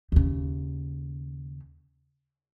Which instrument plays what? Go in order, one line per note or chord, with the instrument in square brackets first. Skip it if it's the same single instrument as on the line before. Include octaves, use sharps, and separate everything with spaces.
[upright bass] D#2 C#3